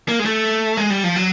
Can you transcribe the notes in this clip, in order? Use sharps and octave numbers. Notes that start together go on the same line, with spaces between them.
A#3
G#3
A3
G#3
G3
F3
F#3